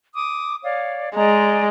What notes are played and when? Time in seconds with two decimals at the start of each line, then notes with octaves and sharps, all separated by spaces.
0.15 D6 D#6
0.64 C#5 D5 F5
1.15 G#3 D5 D#5 A#5